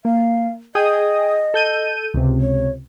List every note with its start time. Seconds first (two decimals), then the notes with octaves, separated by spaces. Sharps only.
0.05 A#3 F5
0.75 G#4 D#5 G5 D#6
1.54 A4 G6 D#7
2.14 C#2 C3
2.40 C#5